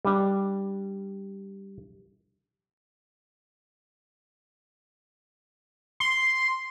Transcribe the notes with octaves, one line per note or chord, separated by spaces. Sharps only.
G3 D4
C6